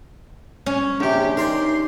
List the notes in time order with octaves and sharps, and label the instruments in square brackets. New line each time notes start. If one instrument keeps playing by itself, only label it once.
[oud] C#4
[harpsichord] A#1 C3 [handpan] D4 [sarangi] G4
[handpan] D#4 [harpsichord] A#4 C5 D5 [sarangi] C6